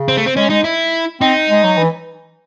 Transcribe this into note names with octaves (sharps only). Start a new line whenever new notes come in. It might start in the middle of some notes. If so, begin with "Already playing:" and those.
Already playing: C#3
C4
A3
C4
G#3 C#4
G#3 D#4
E4
C4 D#4
G#3
F#3
E3